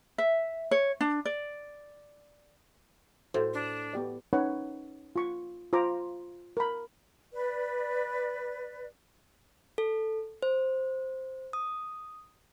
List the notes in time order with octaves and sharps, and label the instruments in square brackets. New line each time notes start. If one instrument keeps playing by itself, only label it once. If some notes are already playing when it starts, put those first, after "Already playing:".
[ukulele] E5
C#5
D4
D5
[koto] A2 [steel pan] F#4 C5
[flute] D4
[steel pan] B3 G4 D5
C#4 D#4 B4 C#5 F#5
F4 C#6
F4 C5 A#5 D6
A#4 B5
[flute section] B4 D5
[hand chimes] A4
C5
D#6